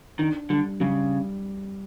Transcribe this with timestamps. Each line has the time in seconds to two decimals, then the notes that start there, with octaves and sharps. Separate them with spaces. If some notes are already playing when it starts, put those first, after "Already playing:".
0.19 D#3 D4
0.50 D3 G3
0.80 C#3 G3